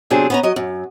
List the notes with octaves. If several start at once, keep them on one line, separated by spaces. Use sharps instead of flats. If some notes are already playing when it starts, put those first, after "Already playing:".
C3 F#3 B3 C4 D4 G#4
B3 C#4 A#5
F#3 D#5
F#2